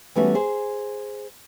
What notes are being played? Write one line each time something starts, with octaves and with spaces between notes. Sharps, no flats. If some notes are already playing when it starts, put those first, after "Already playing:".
E3 G3 A3 B3 C#4 F#4
G#4 C5